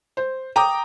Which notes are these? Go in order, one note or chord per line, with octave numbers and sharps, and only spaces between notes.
C5
G5 A#5 D6 D#6